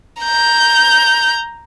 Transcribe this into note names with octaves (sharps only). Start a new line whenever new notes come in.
A#5 G6